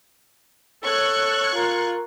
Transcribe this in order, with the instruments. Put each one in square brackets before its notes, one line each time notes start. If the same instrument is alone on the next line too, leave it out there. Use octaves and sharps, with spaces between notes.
[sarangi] A4 [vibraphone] C#5 [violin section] C#6 F#6 G#6
[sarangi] F4 [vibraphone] A#4 A#5